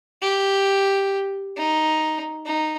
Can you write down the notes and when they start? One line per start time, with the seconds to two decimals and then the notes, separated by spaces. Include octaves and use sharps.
0.22 G4
1.57 D#4
2.46 D#4